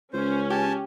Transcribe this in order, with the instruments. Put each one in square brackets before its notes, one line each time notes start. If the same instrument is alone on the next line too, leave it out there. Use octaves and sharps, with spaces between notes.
[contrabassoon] C#2 [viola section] C#4 [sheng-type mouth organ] C5
[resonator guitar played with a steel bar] G4 [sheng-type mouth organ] G#5 A5